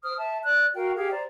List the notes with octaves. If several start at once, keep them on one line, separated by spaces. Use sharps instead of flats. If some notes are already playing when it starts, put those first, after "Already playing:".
C5 D#6 F6
E5 A5
D5 F#6
F#4 A#4 F5 G5
G4 G#4 F5 G5
C5 D5 A#5